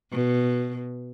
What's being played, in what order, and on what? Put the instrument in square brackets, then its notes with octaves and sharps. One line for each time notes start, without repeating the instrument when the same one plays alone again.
[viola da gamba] B2